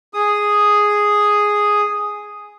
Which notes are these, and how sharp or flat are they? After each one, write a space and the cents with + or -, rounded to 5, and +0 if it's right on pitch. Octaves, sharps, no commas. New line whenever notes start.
G#4 +0 D#6 +0